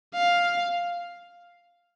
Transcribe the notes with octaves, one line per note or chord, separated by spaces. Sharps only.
F5